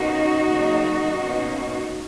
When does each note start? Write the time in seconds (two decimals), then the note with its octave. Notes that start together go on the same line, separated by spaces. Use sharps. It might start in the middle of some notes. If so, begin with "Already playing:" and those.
Already playing: B2 A#3 C#4 D#4 F#4
0.51 C#3 F#3 A#3
1.17 B2 A#3 C#4